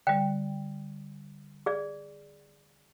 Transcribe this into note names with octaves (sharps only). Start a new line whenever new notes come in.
D3 G3 G5
G#4 D5